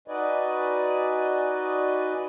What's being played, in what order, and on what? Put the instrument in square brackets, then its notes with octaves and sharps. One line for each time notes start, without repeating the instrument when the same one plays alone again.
[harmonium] D#4 F#4 B4 D5 D#5 G#5